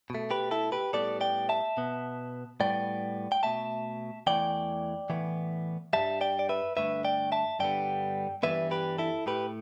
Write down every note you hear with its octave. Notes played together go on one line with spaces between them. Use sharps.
B2 A3
G4 B4
E4 A4
G4 B4
A2 G3 B3 A4 D5
D5 G5
E5 A5
B2 B3
A2 G3 B3 D5 G5
G5
B2 A3 E5 A5
E2 E3 A3 D5 G5
A2 E3 B3
G2 E3 G3 E5 A5
D5 G5
D5
B4 E5
G2 D3 A3 B4 E5
D5 G5
E5 A5
G2 D3 G3 B3 D5 G5
G2 E3 G3 B3 B4 E5
G4 B4
E4 A4
A2 A3 G4 B4